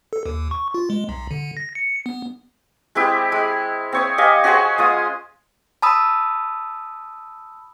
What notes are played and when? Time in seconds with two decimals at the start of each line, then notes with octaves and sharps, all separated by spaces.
0.13 A4
0.26 D#2
0.51 C#6
0.74 F4
0.90 G#3
1.09 B1
1.31 D3
1.57 A#6
1.75 C#7
2.06 B3
2.95 G#3 C4 E4 G4
3.32 G#3
3.92 C4 C#5 D#6
4.18 G4 D#5 F5 G#5
4.44 C#4 F#4 G#4 C5
4.78 G#3 F4 D#6
5.82 A5 B5 D#6 E6